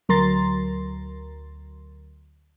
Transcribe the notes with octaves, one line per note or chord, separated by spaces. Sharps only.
D2 F#3 A#4 A#5 C6 A6